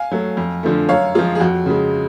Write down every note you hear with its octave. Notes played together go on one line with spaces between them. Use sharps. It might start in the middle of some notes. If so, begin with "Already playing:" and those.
Already playing: F5 G#5
F#3 A3
F2
D3 F3 A3
F#2 C#5 F5
F3 G#3 F4 G#4
G#4
F2 F#4
C#3 G#3